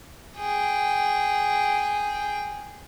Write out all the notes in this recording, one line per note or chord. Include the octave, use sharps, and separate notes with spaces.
G#4 G5